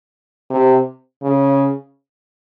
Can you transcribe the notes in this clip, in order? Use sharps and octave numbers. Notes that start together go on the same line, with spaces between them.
C3
C#3